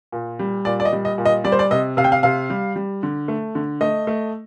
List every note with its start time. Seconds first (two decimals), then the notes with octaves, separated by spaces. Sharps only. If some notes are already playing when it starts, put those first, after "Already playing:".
0.12 A#2
0.39 G3
0.65 A#2 D5
0.80 D5
0.85 D#5
0.93 G3
1.05 D#5
1.18 A#2
1.25 D#5
1.44 G3 D5
1.52 C5
1.59 D5
1.71 C3 D#5
1.97 C3 F5
2.04 G5
2.12 F5
2.23 C3 F5
2.50 G3
2.76 G3
3.03 D3
3.28 A3
3.55 D3
3.81 A3 D#5
4.07 A3